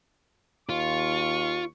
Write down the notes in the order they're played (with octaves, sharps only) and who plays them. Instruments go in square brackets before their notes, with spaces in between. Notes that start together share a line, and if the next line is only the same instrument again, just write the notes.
[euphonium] D#2 [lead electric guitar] F4 [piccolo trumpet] C#6